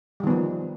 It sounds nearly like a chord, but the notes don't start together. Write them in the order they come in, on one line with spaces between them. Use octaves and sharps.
G3 D#3 B3 F3